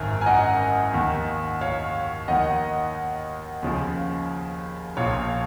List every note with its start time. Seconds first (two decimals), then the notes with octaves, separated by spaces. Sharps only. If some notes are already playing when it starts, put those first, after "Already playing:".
Already playing: G#1 F#2 D#3 A#4
0.21 G#5
0.26 D#5 F#5
0.94 D#2 D#3
1.61 C#5 F5
2.28 D#2 D#3 D#5 F#5
3.63 D#2 C#3 F3
4.97 A#1 A#2 F3 C#5 F5